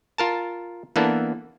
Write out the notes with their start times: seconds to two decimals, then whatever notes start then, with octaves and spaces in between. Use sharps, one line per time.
0.18 F4 A#4 A5
0.96 E3 A#3 B3 D4 A4